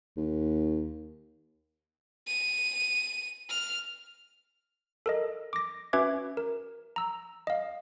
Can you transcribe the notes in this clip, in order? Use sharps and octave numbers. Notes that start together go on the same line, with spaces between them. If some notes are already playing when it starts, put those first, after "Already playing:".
D#2
D#7
F6
A4 A#4 D#5
D6 A#6
C#4 F#4 B4 E5 D6 G#6
A#4
A#5 E6
D#5 F5